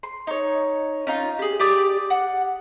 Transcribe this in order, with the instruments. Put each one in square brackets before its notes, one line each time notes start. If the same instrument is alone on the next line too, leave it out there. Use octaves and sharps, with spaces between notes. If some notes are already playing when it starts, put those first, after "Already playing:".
[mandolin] C6
D#4 C#5
C#4 D#4 F4
G4 G#4
G4 D5 D6 D#6
F#5